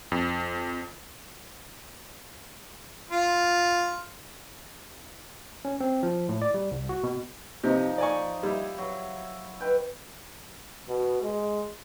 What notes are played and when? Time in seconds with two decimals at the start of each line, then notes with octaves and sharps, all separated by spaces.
0.12 F2
3.11 F4
5.65 C#4
5.81 C4
6.03 F3
6.29 A2
6.42 D5
6.54 G3
6.71 C2
6.89 F#4
7.03 B2
7.64 C3 F3 D#4
7.98 D5 G#5 C#6
8.43 G3 E4
8.78 F#3
9.61 B4 G5
10.89 B2
11.23 G#3